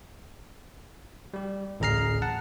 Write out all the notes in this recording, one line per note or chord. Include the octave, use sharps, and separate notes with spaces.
G3 G4
A1 D2 G#4 A#5 F6 C7
F#5 A5